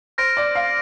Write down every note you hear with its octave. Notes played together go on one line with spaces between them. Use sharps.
C5 F6 A#6 D7
D5
F5